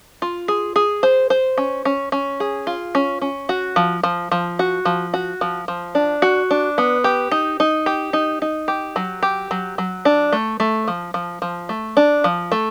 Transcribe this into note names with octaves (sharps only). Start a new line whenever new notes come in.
F4
G#4
G#4
C5
C5
C#4
C#4
C#4
G#4
F4
C#4
C#4
F#4
F3
F3
F3
F#4
F3
F#4
F3
F3
D4
F#4
D4
B3
G4
D#4
D#4
G4
D#4
D#4
G4
F#3
G4
F#3
F#3
D4
A3
A3
F3
F3
F3
A3
D4
F3
A3